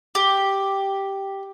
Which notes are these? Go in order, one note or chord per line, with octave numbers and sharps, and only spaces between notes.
G4